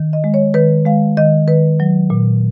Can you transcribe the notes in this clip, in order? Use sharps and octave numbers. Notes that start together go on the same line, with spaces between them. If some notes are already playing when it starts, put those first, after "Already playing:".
Already playing: D#3
D#5
G#3
C#5
D#3 B4
G#3 F5
D#3 D#5
D#3 B4
F#3
A#2